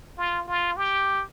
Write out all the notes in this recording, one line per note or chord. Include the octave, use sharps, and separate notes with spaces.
F4
F4
G4